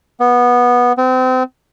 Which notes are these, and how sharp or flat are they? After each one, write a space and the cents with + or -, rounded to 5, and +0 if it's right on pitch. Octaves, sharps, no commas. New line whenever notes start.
B3 -15
C4 -30